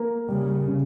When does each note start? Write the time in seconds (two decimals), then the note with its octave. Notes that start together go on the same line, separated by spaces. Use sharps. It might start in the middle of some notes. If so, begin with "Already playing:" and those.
Already playing: A#3
0.28 C#3 G3
0.68 C#3